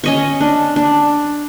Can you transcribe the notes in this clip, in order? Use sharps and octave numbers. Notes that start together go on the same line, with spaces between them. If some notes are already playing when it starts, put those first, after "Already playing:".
C#4 D#5 C#6
D4
D4